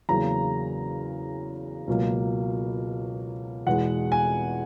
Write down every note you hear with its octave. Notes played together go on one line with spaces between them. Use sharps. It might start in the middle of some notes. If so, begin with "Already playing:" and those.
E2 C#3 F#3 A#3 A#5
C#2 B2 F#3 A#3
E2 B2 G#3 F#5
G#5